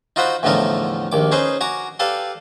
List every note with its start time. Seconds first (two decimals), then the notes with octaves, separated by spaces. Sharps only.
0.16 D#4 F4 F#4 C5 F#5 B5
0.43 E2 A2 D3 F3 D#4 A#4
1.12 A#1 D#2 D6
1.32 C#4 D#4 G#4 B4 C5
1.61 F#4 G#5 A#5 D6
2.00 G4 A4 B4 D5 F5